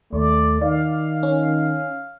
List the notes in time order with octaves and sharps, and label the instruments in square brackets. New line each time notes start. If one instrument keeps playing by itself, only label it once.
[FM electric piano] D#2 [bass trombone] A3 [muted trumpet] D5
[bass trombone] D#3 [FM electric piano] D5 [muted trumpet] F5
[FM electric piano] C#4